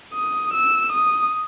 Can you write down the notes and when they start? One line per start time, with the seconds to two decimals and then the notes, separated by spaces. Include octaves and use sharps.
0.13 D#6
0.53 E6
0.92 D#6